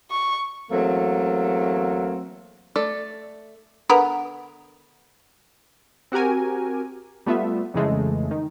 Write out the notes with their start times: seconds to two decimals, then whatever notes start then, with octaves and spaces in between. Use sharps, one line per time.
0.11 C#6
0.71 E2 F#3 A3 A#3 C4
2.76 A3 A4 D5
3.89 D3 B3 A#4
6.12 C4 F#4 G4 A#4 G#5
7.26 G3 A3 B3 F4 E5
7.74 F2 C#3 E3 G#3 A3
8.31 D#3